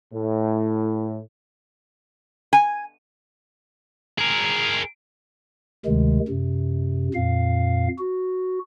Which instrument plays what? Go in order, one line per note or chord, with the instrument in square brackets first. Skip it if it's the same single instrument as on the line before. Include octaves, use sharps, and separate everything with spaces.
[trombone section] A2
[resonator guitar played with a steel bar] G#5
[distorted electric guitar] G#4 A#4
[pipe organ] D2 C3 D#3 G#3
F#2 C3
F2 A#2 F5
F#4